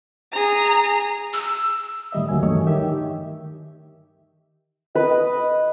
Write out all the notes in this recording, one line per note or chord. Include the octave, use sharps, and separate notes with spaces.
G#4 A#5
E6
A2 D#3 G3 D#5 E5
D2 F#3 A#3 G#5
G2 D#3 E3 A3 C#5 D#5
D#3 G4 E5
B4 D#5